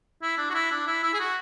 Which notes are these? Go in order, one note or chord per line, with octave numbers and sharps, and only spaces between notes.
E4
D4
F#4
E4
D4
E4
E4
G#4
F#4